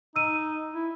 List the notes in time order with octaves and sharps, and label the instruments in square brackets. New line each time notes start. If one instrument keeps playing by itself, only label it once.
[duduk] D#4 [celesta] E6 D#7
[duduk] E4